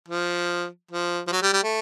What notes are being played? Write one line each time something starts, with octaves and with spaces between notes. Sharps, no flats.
F3
F3
F3
F#3
G3
G3
A3